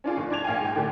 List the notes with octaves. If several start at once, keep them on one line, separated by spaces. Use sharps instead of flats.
C#4 D4 F4 G#4
F1
D4 D6 G#6 F7
A#1 F5 G5 G#5
G#2 G5
A2 D3 D4 G4